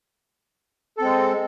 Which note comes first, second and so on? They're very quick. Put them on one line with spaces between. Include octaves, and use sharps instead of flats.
A4 C4 G#3